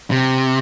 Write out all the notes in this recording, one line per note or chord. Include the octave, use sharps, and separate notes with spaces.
C3